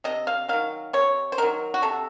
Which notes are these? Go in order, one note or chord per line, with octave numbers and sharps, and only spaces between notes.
C3 D#5
F5
D#3 F#3 F5
C3 C#5
C5
D#3 F#3 A#4
F#4
C3 A4